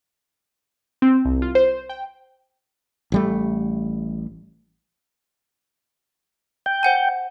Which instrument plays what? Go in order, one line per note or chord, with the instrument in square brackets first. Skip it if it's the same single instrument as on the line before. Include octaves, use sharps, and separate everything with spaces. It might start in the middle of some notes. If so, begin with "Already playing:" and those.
[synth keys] C4
C2
F4
C5
G5
[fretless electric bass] A1 G3 A3
[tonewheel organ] G5
[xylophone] C5 F#5 G#5